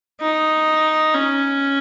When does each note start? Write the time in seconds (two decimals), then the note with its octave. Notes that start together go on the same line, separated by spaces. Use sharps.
0.21 D#4
1.14 C#4